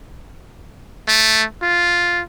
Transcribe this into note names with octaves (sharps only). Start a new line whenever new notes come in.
A3
F4